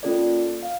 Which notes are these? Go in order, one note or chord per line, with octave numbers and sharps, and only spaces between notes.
A#3 C#4 F4 A4 D5
F5